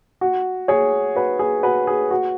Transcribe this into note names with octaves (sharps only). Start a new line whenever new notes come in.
F#4
G#4 C#5
F#4 B4
G#4
F#4 B4
G#4
F#4